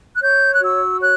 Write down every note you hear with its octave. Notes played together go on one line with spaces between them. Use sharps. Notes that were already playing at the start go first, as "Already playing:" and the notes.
F#6
C#5 G6
F#6
F#4 E6
C#5 F#6